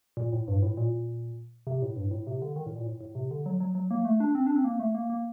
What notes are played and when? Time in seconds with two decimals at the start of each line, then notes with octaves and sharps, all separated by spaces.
0.17 A#2
0.32 A2
0.48 G2
0.62 A2
0.77 A#2
1.67 C3
1.82 A2
1.96 G2
2.11 A2
2.27 C3
2.42 D3
2.56 D#3
2.66 A2
2.76 A#2
2.86 A2
3.01 A2
3.15 C3
3.31 D3
3.46 F#3
3.60 F#3
3.75 F#3
3.91 A#3
4.05 A3
4.20 D4
4.35 C4
4.47 D4
4.56 C4
4.64 A#3
4.80 A3
4.95 A#3
5.10 A#3